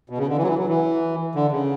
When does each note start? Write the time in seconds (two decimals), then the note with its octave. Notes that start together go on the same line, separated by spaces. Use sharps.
0.10 B2
0.18 C#3
0.28 D3
0.37 E3
0.43 F#3
0.47 E3
0.58 F#3
0.69 E3
1.35 D3
1.52 C#3